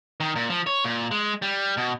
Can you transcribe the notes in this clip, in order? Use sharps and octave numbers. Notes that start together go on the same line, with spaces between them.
D#3
A#2
F3
C#5
A#2
G#3
G3
B2